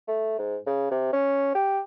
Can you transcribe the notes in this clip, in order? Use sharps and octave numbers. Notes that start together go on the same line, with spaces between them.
A3
G#2
C#3
C3
C#4
G4